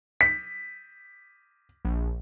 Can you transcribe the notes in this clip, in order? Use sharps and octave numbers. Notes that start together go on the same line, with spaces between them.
B6
A#1